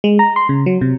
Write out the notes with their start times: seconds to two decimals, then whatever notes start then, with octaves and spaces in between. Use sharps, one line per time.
0.04 G#3
0.19 A#5
0.36 C6
0.49 C#3
0.66 F#3
0.81 C3